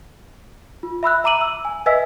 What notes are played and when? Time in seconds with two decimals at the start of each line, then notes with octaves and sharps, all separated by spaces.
0.83 F4
1.03 E5 B5 E6 F#6
1.24 E5 A#5 D6 D#7 F#7
1.41 E6
1.65 G#5
1.86 B4 D#5 E5 G#5 E6 B6